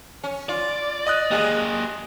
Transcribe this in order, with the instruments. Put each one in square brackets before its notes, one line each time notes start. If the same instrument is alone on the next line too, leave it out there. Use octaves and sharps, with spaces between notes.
[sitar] C#4
[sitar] F4 [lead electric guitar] D5
[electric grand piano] D#5 D#6 F#6
[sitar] G#3 G4 [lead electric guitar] A#3 G#4